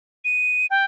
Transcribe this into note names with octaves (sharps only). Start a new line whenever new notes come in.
D#7
G5